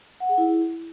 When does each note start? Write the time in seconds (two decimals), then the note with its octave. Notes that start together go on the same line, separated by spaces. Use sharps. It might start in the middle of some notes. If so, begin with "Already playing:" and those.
0.20 F#5
0.29 G#4
0.38 E4